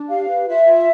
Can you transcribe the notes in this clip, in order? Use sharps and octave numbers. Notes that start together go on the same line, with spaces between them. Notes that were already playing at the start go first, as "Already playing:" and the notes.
Already playing: D4
G4 F5
B4
F4 E5
F4